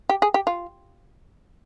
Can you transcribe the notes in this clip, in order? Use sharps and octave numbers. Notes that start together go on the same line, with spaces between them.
G4
G#4
G4
F4